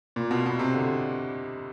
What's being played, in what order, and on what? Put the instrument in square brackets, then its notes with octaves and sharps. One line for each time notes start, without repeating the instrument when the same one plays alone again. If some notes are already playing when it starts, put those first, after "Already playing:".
[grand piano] A#2
B2
B2
C3
D3